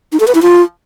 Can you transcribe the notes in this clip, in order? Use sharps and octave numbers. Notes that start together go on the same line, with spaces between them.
D#4
A4
B4
E4
F4